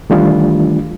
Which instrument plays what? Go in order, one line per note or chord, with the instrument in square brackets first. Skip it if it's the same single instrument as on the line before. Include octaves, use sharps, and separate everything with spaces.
[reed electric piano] D#3 E3 G3 A3 D4 F4